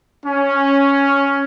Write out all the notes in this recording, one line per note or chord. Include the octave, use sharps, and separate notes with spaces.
C#4